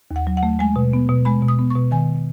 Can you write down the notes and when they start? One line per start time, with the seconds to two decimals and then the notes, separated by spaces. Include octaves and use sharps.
0.11 D#2
0.16 F#5
0.27 F#3
0.37 F#5
0.43 A3
0.59 G#3 G#5
0.76 B2
0.93 B3
1.09 B2
1.25 G#3 B5
1.42 B2
1.48 D#6
1.59 B3
1.70 C#6
1.76 B2
1.91 D#3 G#5